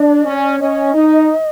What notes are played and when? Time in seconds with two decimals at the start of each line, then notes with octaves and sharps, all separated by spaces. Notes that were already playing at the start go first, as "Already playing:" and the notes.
Already playing: D4 D5
0.25 C#4
0.60 C#4 D#5
0.94 D#4